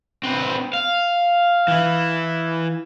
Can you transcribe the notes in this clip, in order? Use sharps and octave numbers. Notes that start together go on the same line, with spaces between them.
C4 B4
F5
E3 E4